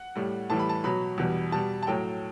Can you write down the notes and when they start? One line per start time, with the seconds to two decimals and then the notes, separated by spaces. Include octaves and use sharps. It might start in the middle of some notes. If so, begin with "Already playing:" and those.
Already playing: F#5
0.16 A2 G3
0.50 A2 E3 G3 A5
0.59 B5
0.69 A5
0.84 B2 F#3 B5
1.18 E2 B2 G3
1.52 B2 G3 A5
1.83 A5
1.87 A2 F#3 G5